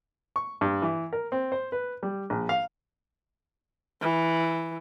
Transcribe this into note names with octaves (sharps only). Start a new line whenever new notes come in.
C#6
G2
E3
A#4
C4
C5
B4
G3
A#1
F5
E3